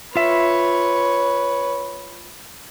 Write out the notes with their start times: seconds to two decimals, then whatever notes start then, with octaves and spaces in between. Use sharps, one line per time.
0.16 F4 B4 C#5 E5